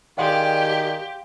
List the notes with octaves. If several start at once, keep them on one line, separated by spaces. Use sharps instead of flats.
D#3 G4 G#4 D5 F5 F#5 C6